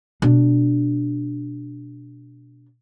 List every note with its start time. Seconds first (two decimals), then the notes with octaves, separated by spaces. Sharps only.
0.22 B2 D4